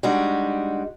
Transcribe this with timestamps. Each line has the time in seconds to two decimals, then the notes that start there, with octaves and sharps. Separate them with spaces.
0.03 G3 G#3 D4 D#4 F#4